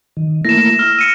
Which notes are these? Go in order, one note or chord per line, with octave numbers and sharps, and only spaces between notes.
D#3
A3 A#3 E4 A#6 E7
E6 F6
C#7 D#7